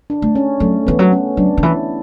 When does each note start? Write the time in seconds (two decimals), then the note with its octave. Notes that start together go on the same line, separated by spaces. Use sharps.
0.10 D4
0.22 A3
0.35 C#4
0.60 F#3 A3
0.87 E3 B3
0.99 F#3
1.12 C#4
1.37 F#3 D4
1.57 D3
1.63 E3 E4